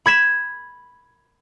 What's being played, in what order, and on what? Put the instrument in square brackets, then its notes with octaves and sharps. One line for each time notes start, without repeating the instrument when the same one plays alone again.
[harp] B5 G#6 B6 E7